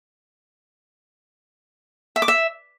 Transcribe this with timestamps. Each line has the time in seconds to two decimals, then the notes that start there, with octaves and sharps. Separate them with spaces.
2.16 E5
2.22 D6
2.28 E5